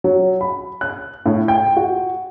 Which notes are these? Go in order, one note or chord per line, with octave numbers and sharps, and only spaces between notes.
F#3
B5
F#6
A2
G5
F#4